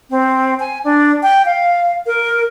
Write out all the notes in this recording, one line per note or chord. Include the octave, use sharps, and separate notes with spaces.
C4
G#5
D4
G5
F5
A#4